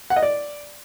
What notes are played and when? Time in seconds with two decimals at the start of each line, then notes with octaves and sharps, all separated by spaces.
0.10 F#5
0.16 D#5
0.23 D5